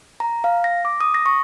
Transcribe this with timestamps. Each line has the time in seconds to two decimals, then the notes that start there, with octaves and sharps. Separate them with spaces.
0.20 A#5
0.44 F5
0.64 A#6
0.85 D6
1.01 D#6
1.14 A#6
1.26 C#6